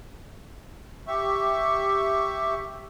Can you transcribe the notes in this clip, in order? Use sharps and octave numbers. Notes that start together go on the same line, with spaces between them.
G4 E5 C#6